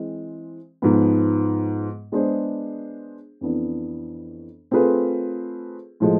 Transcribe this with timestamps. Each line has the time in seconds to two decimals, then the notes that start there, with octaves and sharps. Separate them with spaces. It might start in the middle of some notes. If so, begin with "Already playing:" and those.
Already playing: E3 G#3 C4
0.82 G#2 F3 B3
2.12 G#3 B3 D4 G#4 C5
3.41 F2 E3 B3 D4
4.71 A3 C4 F4 G#4 B4
6.00 A2 F3 G#3